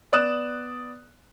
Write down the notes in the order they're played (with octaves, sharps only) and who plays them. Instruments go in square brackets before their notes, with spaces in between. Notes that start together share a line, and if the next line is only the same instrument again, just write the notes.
[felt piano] B3 D5 D#6 F#6 E7